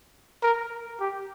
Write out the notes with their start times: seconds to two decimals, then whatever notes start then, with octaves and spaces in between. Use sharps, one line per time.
0.42 A#4
1.00 G4